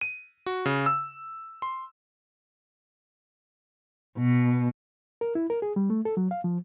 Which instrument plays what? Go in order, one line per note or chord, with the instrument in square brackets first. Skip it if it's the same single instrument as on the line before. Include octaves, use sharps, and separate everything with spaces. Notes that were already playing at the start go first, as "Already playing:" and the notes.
[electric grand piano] D#7
F#4
C#3
E6
C6
[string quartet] B2
[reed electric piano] A#4
E4
A#4
G#4
G3
A3
A4
F#3
F5
F3